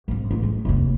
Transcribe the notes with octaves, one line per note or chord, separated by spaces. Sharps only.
G#1 G#2
A1
G#3
F1 D#2